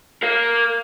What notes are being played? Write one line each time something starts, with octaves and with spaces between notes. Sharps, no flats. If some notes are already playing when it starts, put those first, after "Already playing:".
A#4 F5